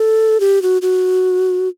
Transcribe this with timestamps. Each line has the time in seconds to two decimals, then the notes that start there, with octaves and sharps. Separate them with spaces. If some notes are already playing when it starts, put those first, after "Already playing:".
Already playing: A4
0.40 G4
0.62 F#4
0.82 F#4